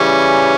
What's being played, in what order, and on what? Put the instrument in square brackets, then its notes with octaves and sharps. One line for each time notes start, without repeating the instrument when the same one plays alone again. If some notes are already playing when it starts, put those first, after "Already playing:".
Already playing: [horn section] C#3 E3 G3 C#4